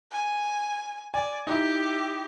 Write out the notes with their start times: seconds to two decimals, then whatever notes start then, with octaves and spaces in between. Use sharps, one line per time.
0.12 G#5
1.14 D5 G#5
1.47 D#4 E4 G4